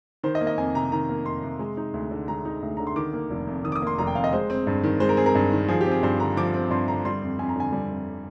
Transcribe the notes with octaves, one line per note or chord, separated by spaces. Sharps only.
D#3 C5
D#5
A#3
D#5
F2 G#5
C3 A#5
D#3 A#5
A#3
F2 C6
C3
G#3
D#4
D2
D3
G#3 A#5
D#4
D2
D3 A#5
C6
D#3 D6
A#3
F1
F2
D#3 D#6
D6
D#6
A#3 C6
F1 A#5
G5
F2 F5
D#5
G#3 C5
C4
G2
D#3
G#3 C5
A#4
C4 G#4
A#4
G2
D#3
F3 G#4
G4
C4
G#4
G2 C5
D3 A#5
F3 D6
C4
G2 C6
D3 A#5
G3 C6
F2
F2 G#5
A#5
D3 G#5
G3
F2